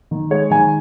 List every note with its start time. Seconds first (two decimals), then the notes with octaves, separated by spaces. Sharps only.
0.11 D#3
0.31 G#3 C#5
0.51 D#3 G#5